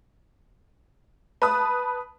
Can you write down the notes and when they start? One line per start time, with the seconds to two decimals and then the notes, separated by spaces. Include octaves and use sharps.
1.42 B4 A5 B5 D#6